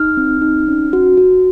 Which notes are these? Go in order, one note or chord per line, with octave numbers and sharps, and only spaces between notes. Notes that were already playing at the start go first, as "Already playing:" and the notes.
Already playing: D#4 F6
C4
D#4
C#4
F#4
F#4